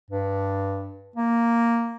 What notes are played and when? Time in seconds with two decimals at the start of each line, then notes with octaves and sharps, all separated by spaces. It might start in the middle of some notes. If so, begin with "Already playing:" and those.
0.10 G2
1.16 A#3